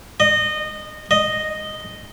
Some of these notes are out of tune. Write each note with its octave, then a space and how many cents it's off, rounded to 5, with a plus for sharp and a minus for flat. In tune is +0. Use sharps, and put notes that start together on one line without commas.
D#5 -20
D#5 -5